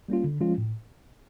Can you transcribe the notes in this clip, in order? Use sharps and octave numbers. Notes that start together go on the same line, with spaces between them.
G3 A#3 C#4 F4
D3
F3 G#3 C#4 F4
A2